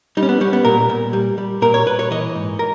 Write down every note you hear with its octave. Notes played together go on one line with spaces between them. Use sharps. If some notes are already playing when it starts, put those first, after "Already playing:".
G3 D#4
C#4
B3
G3 C#4
B3
A#2 A#4
A#2
G3
G3
A#2 A#4
C#5
A#2 B4
C#5
E3 D#5
G#2
A#4